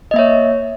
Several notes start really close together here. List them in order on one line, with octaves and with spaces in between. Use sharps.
D#5 A#3 E5 C#5